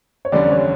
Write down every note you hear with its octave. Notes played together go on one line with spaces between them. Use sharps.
C#5
F1 E2 D3 G3 C#4 D5
C#5